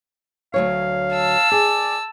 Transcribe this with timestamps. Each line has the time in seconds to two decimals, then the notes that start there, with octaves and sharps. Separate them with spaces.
0.54 D2 F#3 C#5 F5
1.15 A5 E6
1.51 G#4 D5